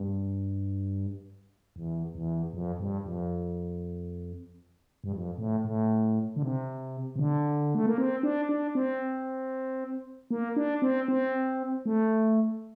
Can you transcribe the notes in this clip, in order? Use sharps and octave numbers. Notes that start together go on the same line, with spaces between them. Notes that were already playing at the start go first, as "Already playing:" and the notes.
Already playing: G2
E2
E2
F2
G2
F2
G2
F2
A2
A2
D3
C3
C3
D3
A3
A#3
C4
D4
D4
C4
A#3
D4
C4
C4
A3